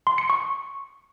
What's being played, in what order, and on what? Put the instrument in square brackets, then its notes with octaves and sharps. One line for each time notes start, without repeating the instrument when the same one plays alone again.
[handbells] C6
C#7
C#6